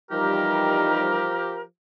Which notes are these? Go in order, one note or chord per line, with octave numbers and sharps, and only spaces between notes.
E3 F3 G3 D#4 G4 A#4